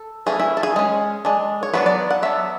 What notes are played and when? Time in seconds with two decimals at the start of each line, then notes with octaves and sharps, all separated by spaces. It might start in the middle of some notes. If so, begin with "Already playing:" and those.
Already playing: A4
0.26 E3 A3 C#4 G#4
0.40 E4
0.57 A4
0.63 G#4
0.76 G#3 C#4
1.25 G#3 D4
1.63 C#5
1.74 F#3 B3 D4 B4
1.86 D5
2.11 F#5
2.22 F#3 B3 D4 E5